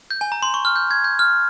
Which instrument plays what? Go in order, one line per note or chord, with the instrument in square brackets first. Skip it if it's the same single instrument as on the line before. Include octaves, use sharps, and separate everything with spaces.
[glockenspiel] G6
G#5
A#5
C6
C#6
F6
G6
G#6
G6
F6